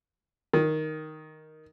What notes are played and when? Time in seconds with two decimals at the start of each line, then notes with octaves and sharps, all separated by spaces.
0.53 D#3